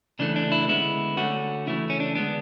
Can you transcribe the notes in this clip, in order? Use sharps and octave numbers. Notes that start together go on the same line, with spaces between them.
C#3 E3 A3 D4
D4
E4
D3 G#3 B3 E4
D3 A3 C#4 F#4
C#3 E3 A3 E4
C#4
D4
D3 G#3 B3 D4